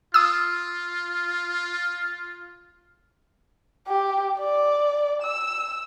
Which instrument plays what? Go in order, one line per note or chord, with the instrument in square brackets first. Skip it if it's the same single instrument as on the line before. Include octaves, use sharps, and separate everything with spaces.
[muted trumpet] F4 [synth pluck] D#6 E6
[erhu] G4
D5
E6